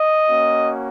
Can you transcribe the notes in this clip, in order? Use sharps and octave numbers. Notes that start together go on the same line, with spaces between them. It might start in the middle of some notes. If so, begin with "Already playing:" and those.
Already playing: D#5
A#3 C#4 F#4